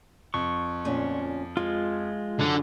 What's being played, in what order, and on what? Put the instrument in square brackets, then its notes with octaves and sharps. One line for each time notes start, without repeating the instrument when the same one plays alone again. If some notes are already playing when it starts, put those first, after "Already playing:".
[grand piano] F2 [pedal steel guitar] C#6
[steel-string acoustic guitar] D2 A#2 C#4
[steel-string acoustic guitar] F3 [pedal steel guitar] G#3 F4
[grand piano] F#2 [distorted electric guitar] D3